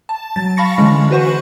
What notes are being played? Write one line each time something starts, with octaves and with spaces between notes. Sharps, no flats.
A5
F#3 A6
F5 A5 B5 C#6 A#6 C#7
D3 E3 G#3 C#4
F#4 B4 C5 F#5 C#6